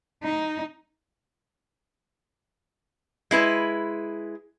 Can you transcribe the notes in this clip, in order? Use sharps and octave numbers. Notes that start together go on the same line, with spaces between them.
D#4
G#3 E4 B4